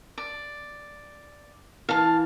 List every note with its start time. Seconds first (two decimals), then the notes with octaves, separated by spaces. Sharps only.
0.18 D5
1.89 E3 F5 A5